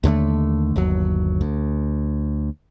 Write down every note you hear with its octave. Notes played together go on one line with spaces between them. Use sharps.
D#2 D3 G3 A3
G1 D#2 F#3
D2